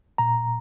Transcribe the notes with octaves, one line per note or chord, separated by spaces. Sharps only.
A#2 A#5